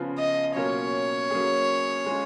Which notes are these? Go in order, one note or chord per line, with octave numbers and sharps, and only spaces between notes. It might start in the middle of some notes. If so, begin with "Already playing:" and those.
Already playing: C#3 F3 B3 F4
D#5
B2 F#3 A#3 C#4 F4 C#5
F#3 A#3 C#4 G#4
G#3 C#4 F4